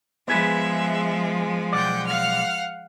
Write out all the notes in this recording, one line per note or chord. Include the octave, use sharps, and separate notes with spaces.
F3 G#3 B3 G#4 B4 E5
B1 D5 F#5 G5
F5 F#5 F6